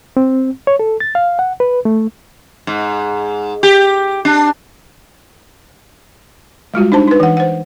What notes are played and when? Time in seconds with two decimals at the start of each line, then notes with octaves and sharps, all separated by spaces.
0.17 C4
0.67 C#5
0.79 A4
1.00 A6
1.15 F5
1.39 F#5
1.60 B4
1.85 A3
2.67 G#2
3.63 G4
4.25 D4
6.74 G3 G#3 F4 F#4
6.92 D4 D#4 C5 A5
7.08 D#4 B4
7.20 E3 F#5
7.37 C5 F#5